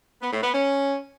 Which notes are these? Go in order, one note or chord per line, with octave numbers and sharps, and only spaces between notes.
B3
A2
B3
C#4